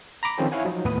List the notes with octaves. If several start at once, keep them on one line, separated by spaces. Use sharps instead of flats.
A#5 B5 D6
D#3 F3 C4 C#4 G4 A4
E4 C#5 F5 F#5 G#5
F3 F#3 D#4
D#2 A2 B3 B4 D#6